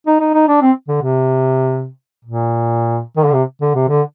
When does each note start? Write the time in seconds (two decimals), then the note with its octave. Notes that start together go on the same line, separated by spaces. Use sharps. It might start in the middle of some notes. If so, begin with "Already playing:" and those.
0.07 D#4
0.20 D#4
0.34 D#4
0.48 D4
0.61 C4
0.88 D3
1.02 C3
2.25 A#2
3.17 D#3
3.25 D3
3.34 C3
3.61 D3
3.75 C3
3.89 D3